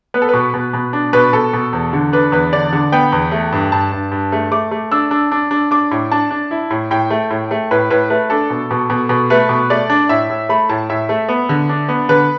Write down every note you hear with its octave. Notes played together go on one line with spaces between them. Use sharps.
B3 B4
A4
B2 B4
B2
B2
D4
B2 B4
B2 A4
B2
E2
D3
D4 B4
E2 B4
D3 D5
D3
B3 G5
E2
A3
G2
G2 A5
G2
G2
A3
A3 D6
A3
D4 E6
D4
D4
D4
D4 D6
A2
D4 A5
D4
E4
A2
A2 G5
A3
A2
A3
A2 B4
A2 B4
A3 B4
D4 A4
B2
B2
B2
B2
A3 B4
B2
A3 D5
D4
A2 E5
A2
A3 B5
A2 A5
A2 E5
A3
B3
D3
D4
B3
D3 B4